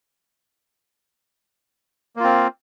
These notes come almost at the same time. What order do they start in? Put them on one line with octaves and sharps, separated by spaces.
A#3 F4 C4